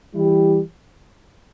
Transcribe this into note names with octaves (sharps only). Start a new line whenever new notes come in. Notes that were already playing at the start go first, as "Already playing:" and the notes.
E3 G3 E4 G4